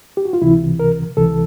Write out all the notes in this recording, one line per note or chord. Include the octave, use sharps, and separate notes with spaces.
G4
F#4
F4
C#2 C3 E3 E4
A#4
C#2 C3 E3 A4